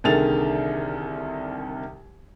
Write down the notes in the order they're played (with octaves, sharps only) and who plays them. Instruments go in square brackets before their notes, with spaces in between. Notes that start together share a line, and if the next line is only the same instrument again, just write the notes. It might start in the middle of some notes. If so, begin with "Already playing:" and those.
[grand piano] C2 D3 D#3 G#4 A6 F7